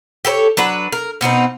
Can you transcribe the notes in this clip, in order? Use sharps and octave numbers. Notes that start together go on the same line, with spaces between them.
G4 A4 A#4 C#5
F#3 D4 B4
A#4
B2 B3 C4 D#4